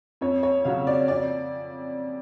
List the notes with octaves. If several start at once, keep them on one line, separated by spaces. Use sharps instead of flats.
F2 C#5
C#5
C#3 F#3 F5
D5
F2 D5